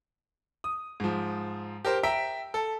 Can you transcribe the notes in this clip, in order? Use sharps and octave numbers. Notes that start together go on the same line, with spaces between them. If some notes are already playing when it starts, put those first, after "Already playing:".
D#6
G#2 F3
G4 A#4 C5
E5 G5 A#5 B6 D7
A4